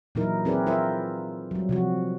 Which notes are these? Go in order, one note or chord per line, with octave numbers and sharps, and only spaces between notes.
A#2 E3 F#3 D#4 E4 A#4
C4 E4 G#4 A#4 B4 D5
E4 F4 A#4 C5 E5
F#3 G3
C3 F3 F#4